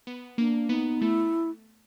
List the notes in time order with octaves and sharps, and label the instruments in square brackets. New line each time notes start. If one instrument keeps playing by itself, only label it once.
[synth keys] B3
[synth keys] A#3 [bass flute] D4
[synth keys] B3 [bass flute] D#4
[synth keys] A3 [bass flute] E4